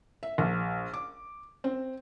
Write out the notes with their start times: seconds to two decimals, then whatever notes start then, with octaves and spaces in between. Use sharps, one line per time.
0.23 E5
0.38 A#1
0.94 D6
1.64 C4